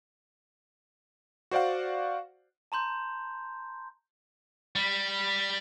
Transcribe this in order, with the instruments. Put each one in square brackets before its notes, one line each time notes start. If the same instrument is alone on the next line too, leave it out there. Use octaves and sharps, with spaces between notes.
[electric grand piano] F#4 C5 D5 F5 F#5
[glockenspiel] A5 A#5 C6 G6
[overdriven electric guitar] G3